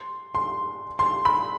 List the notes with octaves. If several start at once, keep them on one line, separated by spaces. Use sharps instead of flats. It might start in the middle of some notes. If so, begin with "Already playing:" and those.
Already playing: C6
C6
C6
B5